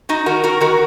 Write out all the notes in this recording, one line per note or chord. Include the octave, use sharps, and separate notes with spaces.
D#4 F#4
D#3 F#4 A#4
F#4 A#4
D#3 F#4 A#4